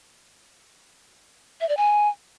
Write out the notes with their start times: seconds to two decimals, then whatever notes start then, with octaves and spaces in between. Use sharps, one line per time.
1.61 E5
1.69 D5
1.77 G#5